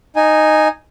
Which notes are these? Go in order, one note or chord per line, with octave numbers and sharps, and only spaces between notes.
D#4 G#5